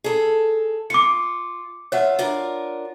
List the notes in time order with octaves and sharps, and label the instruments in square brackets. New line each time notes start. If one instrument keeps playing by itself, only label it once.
[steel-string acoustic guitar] G#4 A4
[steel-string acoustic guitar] F4 [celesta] D6 C#7
[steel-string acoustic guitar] F4 E5 [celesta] C#5 F#5
[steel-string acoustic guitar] D4 F4 A#4